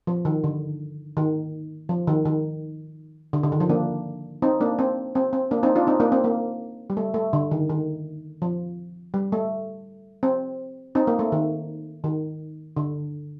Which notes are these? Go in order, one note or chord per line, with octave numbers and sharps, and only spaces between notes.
F3
D#3
D3
D#3
F3
D#3
D#3
D3
D3
D#3
F3
A#3 D4
C4 D#4
A#3 D4
C4
C4
C4
A#3 D4
C4 D#4
D4 F4
C4 D#4
A#3 D4
C4
A#3
G3
A3
A3
D3
D#3
D#3
F3
G3
A3
C4
C4 D#4
A#3
A3
D#3
D#3
D3